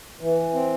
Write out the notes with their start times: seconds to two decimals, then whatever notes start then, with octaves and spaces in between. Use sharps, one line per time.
0.21 E3
0.54 C4